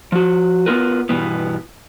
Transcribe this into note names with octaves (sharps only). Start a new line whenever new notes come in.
F3 F#4
B3 C4 F4 A#4 B4
G2 B2 E3 B3